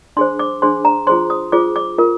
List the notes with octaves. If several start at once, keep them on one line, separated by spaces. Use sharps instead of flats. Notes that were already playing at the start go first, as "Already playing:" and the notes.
D4 G#4 C5 C6
D6
D4 G#4 C5 C6
A#5
F4 G#4 C5 C6
D#6
F4 G#4 C5 D6
D6
F4 A#4